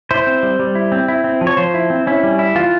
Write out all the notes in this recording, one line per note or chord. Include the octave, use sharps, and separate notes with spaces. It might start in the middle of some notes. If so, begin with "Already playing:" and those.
E4 C5
C4
G3
G3
E4
C4
E4
C4
F3
C#5
F3 C5
E4
C4
C#4 E4
G3
E4
E3 F4